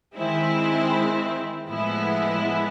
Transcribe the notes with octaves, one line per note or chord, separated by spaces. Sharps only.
D#3 G#3 C4 E4
A2 F3 G#3 B3 E4